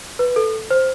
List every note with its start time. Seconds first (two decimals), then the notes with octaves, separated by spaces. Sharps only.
0.19 B4
0.36 A4
0.70 C5